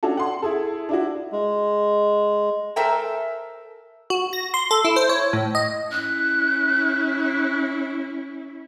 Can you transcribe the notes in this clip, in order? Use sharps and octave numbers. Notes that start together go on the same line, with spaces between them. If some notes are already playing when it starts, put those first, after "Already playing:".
C#4 D4 F#4 A4
F#5 C6
E4 G#4 A4
D4 E4 F#4
G#3
A4 A#4 C5 E5 G5 G#5
F#4
A#6
C6
A4
E4
C5
C#5
A2
D#5
C#4 E4 F#6